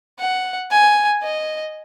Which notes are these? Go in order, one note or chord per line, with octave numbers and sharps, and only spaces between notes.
F#5
G#5
D#5